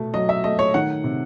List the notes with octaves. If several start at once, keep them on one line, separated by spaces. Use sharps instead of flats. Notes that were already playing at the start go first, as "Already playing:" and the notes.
Already playing: B2 A3
F#3 D#5
E5
A3 D#5
C#5
D#3 F#5
C3